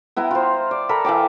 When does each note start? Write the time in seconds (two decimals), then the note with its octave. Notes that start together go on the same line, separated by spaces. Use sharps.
0.16 B3 E4 G5 A#5
0.31 F4 C5
0.71 D5
0.89 A4 A#4 B5
1.05 E3 F5 G5 D6